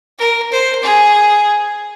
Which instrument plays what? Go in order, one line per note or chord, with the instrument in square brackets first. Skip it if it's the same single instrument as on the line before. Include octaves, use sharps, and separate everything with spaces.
[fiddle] A#4
C5
G#4